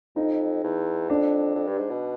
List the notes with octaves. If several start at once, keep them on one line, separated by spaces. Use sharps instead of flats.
F2 D#4
E2
F2 D4
F2
G2
G#2
B2